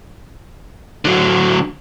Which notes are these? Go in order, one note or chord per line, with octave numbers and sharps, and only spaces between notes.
D3 F#3